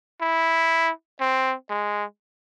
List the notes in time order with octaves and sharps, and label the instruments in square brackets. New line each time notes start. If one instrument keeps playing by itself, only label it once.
[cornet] E4
C4
G#3